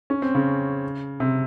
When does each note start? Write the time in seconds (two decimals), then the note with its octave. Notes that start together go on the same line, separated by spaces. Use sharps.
0.10 C#4
0.22 C4
0.35 C#3
1.20 C3